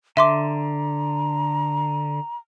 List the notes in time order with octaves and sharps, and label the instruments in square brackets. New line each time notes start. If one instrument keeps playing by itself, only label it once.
[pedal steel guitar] D3 [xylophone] E5 C6 D6 [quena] A#5